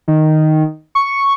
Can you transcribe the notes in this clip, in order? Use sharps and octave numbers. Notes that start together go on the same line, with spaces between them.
D#3
C#6